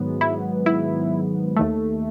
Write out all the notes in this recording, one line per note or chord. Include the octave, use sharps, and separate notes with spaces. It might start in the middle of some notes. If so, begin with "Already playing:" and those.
Already playing: G#2 D#3 F#3 B3
E4
E4
D#2 D#3 A3